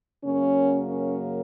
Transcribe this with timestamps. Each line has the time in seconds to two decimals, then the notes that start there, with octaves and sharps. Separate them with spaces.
0.23 F#2 C#3 F#3 A#3 C#4
0.88 C#4